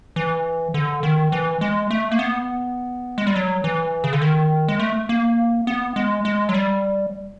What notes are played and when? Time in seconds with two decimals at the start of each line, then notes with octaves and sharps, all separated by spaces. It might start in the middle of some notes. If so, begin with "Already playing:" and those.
0.16 E3
0.74 D3
1.03 D#3
1.32 E3
1.61 G#3
1.91 A3
2.12 A#3
2.19 B3
3.18 G#3
3.27 G3
3.36 F#3
3.64 E3
4.04 C#3
4.13 D3
4.22 D#3
4.68 G#3
4.79 A3
5.09 A#3
5.67 B3
5.96 G#3
6.25 G#3
6.49 F#3
6.54 G3